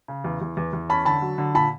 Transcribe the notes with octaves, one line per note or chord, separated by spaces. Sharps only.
C#3
E2
E2
E2
E2
C#4 A5 B5
D3 A5 B5
F#3
D3
A#2 A5 B5